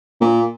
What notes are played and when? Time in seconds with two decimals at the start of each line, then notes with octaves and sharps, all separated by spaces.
0.21 A#2